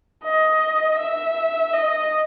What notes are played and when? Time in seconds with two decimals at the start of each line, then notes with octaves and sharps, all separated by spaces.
0.23 D#5
0.98 E5
1.73 D#5